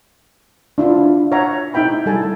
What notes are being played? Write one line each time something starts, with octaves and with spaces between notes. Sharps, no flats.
D4 E4 F4
C#5 E5 F#5 A#5
D#4 E4 E5 G5 B5
G3 E4 A4 G#5 A5